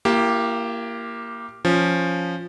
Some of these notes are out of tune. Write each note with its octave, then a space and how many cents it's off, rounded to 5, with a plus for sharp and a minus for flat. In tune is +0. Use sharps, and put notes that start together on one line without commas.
A#3 +0 E4 +45 G4 +0
F3 +0 C#4 +0